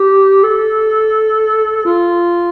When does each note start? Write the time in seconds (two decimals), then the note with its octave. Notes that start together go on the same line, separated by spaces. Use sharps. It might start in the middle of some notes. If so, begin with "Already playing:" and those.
Already playing: G4
0.43 A4
1.85 F4